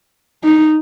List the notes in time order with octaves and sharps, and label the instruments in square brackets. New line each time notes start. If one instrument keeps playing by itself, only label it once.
[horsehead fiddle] D#4